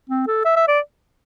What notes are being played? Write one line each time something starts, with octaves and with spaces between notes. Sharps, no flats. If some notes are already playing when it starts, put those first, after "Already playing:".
C4
A4
E5
E5
D5